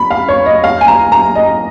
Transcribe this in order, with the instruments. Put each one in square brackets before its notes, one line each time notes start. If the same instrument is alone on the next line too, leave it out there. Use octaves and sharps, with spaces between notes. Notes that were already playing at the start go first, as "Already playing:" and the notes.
Already playing: [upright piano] B5
F5
C#5
D#5
F5
G#5
A#5
A#5
D#5